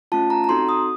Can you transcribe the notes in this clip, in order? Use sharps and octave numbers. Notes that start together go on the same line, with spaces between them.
A3 C#4 F4 A5
A#5
A#5
C4 D#4 F#4 A4 C6
D#6